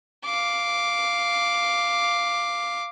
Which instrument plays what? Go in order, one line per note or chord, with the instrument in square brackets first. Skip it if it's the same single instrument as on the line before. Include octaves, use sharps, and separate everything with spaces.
[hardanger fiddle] F5 D6